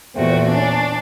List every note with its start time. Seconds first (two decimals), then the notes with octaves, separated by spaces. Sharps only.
0.15 E2 A#2 A3 C4 F#4
0.49 C#4 D4 A5